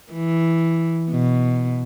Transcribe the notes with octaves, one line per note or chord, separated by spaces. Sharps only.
E3
B2